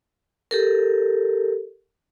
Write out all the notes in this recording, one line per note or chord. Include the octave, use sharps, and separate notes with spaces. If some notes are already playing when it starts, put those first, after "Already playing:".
G4 A4 A#4